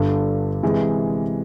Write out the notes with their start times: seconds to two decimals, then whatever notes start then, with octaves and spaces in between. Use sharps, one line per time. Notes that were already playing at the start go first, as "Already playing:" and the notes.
Already playing: G1 G2 D3
0.63 C3 E3 G#3